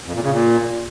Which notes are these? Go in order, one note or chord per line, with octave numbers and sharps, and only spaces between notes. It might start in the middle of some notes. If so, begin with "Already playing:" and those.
F2
A#2
C#3
A#2